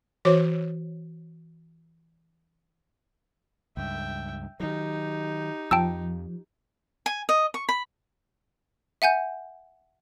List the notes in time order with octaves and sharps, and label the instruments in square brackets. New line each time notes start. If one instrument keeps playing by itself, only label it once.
[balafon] E3 F#4 C5 C#5 D6
[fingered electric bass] C#2 G2 [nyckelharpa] E5 G5
[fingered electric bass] D#3 F#3 [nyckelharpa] D#4 G4
[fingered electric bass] F2 [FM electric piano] F3 [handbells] G5 A5 E6
[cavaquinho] G#5
D#5
C#6
B5
[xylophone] E5 F#5 G#5 G6